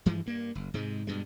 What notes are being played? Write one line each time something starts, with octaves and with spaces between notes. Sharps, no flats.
G2 E3 F3 G#3
G2 A#3
F#1
G#2 C3 G#3
G2 B2 G#3